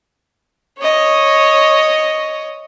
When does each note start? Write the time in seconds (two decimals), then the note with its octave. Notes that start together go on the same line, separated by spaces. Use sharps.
0.79 C#5 D#5